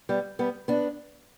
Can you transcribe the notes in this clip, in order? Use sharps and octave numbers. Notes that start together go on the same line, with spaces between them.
G3 B3
G3 B3
B3 D4